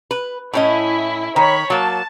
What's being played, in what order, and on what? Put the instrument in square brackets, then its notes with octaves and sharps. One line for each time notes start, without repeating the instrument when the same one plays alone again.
[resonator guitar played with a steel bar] B4
[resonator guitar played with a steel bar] A2 C#4 D#5 [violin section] E4
[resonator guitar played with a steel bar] D#3 [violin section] C#5 B5
[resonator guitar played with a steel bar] F#3 A#3 [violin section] A5